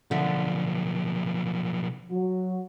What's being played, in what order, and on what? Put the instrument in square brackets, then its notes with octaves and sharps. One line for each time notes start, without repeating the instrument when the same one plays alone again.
[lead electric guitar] B1 F3 [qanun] D3 E5
[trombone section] F#3 F#4